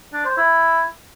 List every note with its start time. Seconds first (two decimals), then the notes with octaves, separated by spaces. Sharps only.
0.13 D4
0.25 C5
0.37 E4